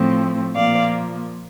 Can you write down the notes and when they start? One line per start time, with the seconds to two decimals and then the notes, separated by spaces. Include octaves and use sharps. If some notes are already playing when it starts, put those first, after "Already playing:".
Already playing: A2 F3 A3 C4
0.56 A#2 F3 A#3 D5 F5